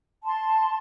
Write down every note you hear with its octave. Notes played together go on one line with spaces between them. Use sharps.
A5 C6